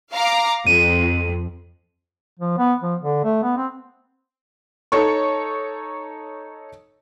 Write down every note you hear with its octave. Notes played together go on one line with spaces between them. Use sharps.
F5 A#5 D6
F2 D#7
F3
B3
F3
D3
A3
B3
C4
D#4 A4 C#5 C#6